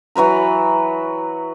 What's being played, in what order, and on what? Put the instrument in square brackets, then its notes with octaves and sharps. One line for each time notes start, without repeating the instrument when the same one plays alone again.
[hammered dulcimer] E3 F#3 B4 A#5